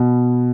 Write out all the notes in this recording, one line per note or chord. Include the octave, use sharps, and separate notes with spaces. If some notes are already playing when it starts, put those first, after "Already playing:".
Already playing: B2